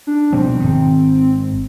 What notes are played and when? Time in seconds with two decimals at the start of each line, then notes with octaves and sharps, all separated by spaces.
0.07 D4
0.33 B2 F3 G3 C4
0.60 G#1 G#2 D#3